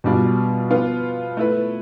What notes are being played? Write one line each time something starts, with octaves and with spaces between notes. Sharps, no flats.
B2 G3 D4 F4
F3 B3 F4
A3 E4 B4